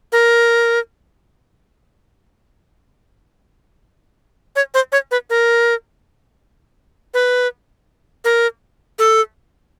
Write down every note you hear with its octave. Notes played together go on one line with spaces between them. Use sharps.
A#4
C#5
C5
C#5
B4
A#4
B4
A#4
A4